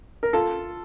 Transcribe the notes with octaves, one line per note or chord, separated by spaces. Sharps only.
A#4
F4 A4